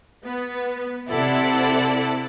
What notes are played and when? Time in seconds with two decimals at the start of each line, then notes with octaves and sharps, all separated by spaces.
0.25 B3
1.09 C3 E4 A4 D5 F#5